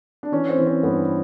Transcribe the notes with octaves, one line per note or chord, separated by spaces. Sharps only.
D4
E3 C#4
C4
E3
C4
G2 B3